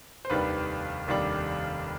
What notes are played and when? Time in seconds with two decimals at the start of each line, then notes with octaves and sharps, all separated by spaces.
0.25 C5
0.30 F1 D#2 D#3 G3 D4 B4
1.07 F1 D#2 D#3 G3 D4